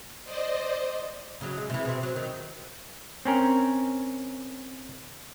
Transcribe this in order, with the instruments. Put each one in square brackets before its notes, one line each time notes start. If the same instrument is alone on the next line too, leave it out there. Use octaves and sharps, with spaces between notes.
[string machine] C5 D5 D#5
[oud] C#3 F#3
G#3
C3 E3
B2 C4
F#3
D#3
[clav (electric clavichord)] C4 C#4 A#4